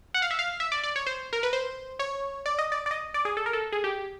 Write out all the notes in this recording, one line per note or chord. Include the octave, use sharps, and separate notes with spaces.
F#5
F5
E5
F5
E5
D5
D5
C#5
C5
A#4
B4
C5
C#5
D5
D#5
D5
D5
D#5
D5
G#4
A4
A#4
A4
G#4
G4